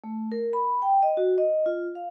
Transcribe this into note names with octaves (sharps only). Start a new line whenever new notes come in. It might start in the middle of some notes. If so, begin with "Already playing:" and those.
A3
A#4
B5
G5
D#5
F#4
D#5
F4
F5